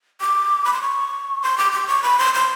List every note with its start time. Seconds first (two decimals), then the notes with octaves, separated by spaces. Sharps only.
0.21 D6
0.65 B5
0.73 C6
0.81 C#6
1.42 C6
1.58 D6
1.72 D6
1.87 C#6
2.03 B5
2.19 C6
2.34 C6